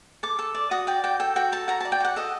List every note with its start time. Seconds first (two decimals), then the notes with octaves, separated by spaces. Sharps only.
0.23 A4 D6
0.39 A4
0.55 D5
0.71 F#4 D#6
0.87 D5 G5
1.04 F#4 G5
1.20 A4 G5
1.36 F#4 G5
1.52 A4 A5
1.68 F#4 A#5
1.81 D5 A5
1.92 G5
2.00 F#4 F#5
2.16 A4 D#5